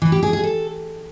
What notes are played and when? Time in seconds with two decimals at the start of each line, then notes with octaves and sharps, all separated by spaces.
0.02 E3
0.12 G4
0.23 G#4
0.33 G#4
0.44 A4